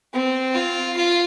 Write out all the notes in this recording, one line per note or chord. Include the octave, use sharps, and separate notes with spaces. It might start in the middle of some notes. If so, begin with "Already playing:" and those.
C4
F4
F4